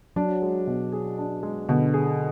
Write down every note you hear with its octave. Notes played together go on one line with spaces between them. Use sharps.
F#3 D4
G#3
B2
G#4
D4
G#3
B2 D3
G#4